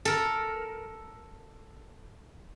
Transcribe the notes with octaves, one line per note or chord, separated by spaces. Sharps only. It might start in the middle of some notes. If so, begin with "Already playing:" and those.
A4 A#4